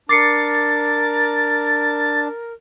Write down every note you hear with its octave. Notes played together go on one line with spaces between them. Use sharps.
D4 A#4 D6 A6 C7 C#7